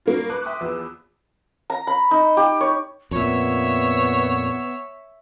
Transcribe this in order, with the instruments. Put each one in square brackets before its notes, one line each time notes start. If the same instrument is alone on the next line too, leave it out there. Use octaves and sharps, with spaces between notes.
[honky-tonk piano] F#3 G3 A#3 C#4 F4
B4 A5 C#6 D6 F#6
E5 G5 C6 D6 D#6
E2 F3 B3 E6
[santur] A#5
B5
D#4
G4
C#5
[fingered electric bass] F2 A#2 [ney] B3 [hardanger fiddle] C#5 E5